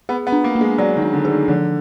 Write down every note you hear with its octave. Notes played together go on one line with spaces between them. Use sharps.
B3 G#4
B3
D4
A#3
A#3
G#3
F#3 D5
D#3
D4
D3
G#4
D#3
D3 F3